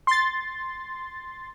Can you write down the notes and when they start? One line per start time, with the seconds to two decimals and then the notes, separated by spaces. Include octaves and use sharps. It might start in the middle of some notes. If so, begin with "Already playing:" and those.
0.07 C6 A6